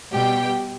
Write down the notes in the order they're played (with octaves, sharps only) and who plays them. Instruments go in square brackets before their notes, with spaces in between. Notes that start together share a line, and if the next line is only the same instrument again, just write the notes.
[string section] B2 G3 G4 G5